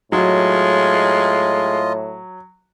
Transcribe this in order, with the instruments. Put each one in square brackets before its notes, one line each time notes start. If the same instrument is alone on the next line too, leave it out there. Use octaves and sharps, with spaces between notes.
[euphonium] A2 [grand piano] F#3 [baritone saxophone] G#3 [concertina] F4 D#5